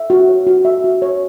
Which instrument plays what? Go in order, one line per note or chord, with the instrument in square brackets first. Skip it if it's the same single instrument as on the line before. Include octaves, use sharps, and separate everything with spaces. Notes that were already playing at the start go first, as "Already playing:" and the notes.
Already playing: [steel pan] E5
F#4
C#5
F#4
E5
F#4
C#5